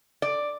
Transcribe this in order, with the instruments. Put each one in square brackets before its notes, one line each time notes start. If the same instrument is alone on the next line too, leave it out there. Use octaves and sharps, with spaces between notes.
[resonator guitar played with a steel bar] D5